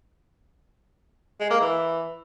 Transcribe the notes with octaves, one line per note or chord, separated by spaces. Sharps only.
G#3
A#3
E3